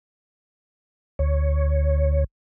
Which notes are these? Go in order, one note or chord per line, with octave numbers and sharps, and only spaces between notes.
D2 C#5